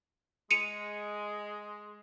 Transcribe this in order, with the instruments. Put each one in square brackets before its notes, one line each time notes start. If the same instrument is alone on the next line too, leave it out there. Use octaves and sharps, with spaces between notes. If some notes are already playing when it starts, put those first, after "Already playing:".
[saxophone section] G#3 [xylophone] C#7 D#7 F7